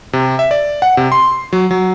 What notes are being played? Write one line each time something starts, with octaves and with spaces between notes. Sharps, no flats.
C3
E5
D5
F#5
C3
C6
F#3
F#3